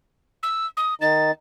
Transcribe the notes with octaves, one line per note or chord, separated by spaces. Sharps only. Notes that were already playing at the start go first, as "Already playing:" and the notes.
E6
D#6
D#3 D#4 A6